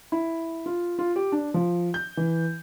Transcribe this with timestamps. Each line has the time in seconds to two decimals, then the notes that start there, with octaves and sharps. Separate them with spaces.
0.12 E4
0.66 F4
0.99 F4
1.16 G4
1.32 D4
1.54 F3
1.94 G6
2.17 E3